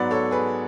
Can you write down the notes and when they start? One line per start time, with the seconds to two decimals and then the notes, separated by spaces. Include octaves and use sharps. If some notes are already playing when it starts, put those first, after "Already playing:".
Already playing: G#2 F#3 B3 B4 D5
0.11 A4 C#5
0.31 G#4 B4